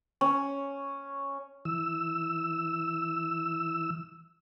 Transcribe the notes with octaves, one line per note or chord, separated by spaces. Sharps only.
C#4
E3 E6